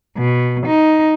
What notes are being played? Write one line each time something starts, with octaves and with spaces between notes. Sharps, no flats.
B2
D#4